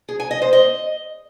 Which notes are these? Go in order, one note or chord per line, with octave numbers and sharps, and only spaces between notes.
G#4
G#5
D#5
C5
D#5